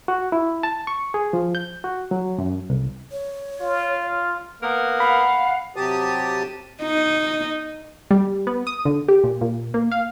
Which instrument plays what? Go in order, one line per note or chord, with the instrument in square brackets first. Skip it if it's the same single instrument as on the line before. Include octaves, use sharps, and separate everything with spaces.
[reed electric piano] F#4
E4
A5
C#6
G#4
F3
G6
F#4
F#3
F#2
C2
[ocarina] C#5
[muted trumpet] F4
[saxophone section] A#3 B3 A#4
[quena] F5 [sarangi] F#5 [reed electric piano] B5
[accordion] C3 F#3 G4 A5 D#6
[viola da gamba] D#4
[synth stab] G3
B3
D#6
D3
G4
A#2
A#2
A#3
F5